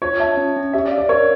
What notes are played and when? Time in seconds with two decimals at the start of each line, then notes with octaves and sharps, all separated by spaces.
0.02 F4 C#5
0.20 E5 A5
0.37 C#4
0.56 C#4
0.73 G4 E5
0.85 D5
0.91 F5
0.98 D5
1.09 A#4 C#5